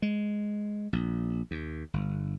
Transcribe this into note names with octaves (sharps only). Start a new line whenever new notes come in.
G#3
A#1
D#2
G1